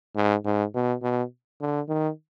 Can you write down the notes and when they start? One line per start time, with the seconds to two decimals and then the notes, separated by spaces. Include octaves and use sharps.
0.15 G#2
0.44 G#2
0.74 B2
1.02 B2
1.61 D3
1.88 D#3